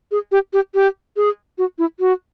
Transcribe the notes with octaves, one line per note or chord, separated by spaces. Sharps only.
G#4
G4
G4
G4
G#4
F#4
E4
F#4